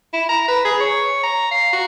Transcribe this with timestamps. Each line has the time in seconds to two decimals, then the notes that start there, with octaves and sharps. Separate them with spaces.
0.13 E4
0.29 A#5
0.48 B4
0.65 G#4
0.81 C#5
1.23 A#5
1.51 F5
1.73 F#4